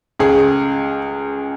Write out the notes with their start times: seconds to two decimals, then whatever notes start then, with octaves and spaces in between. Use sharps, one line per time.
0.19 C#2 G#4